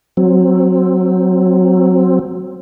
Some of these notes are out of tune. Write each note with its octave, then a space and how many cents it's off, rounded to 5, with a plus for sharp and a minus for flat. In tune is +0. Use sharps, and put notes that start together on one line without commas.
F#3 -10 C4 +0